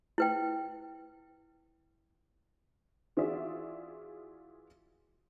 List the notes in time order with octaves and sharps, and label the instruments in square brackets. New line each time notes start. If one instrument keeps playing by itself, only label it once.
[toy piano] E4 B4 G5
[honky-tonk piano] E3 F4 F#4 G#4 D5 E5